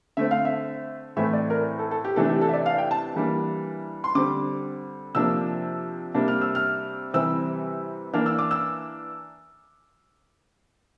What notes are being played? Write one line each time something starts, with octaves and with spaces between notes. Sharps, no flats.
D3 A3 C4 E5
F5
E5
A2 E3 A3 C4 E5
D5
A#4
A4
A4
G4
C3 E3 A3 D4 A4
G4
A4
E5
D5
F5
G5
A5
E3 G3 A#3 D4
C6
D3 G3 C4 D6
C3 F3 A#3 D4 E6
C3 G3 A#3 D4
F6
E6
F6
C3 E3 G3 C4 E6
E3 A#3 D4 F6
E6
D6
E6